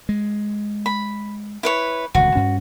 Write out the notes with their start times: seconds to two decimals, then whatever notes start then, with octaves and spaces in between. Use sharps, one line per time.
0.09 G#3
0.86 B5
1.63 E4 B4 C#5
2.15 D#1 C#2 D3 F#4
2.35 G2 C#4